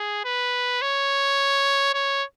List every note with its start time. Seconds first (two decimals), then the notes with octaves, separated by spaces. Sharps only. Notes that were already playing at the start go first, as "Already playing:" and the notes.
Already playing: G#4
0.25 B4
0.82 C#5
1.94 C#5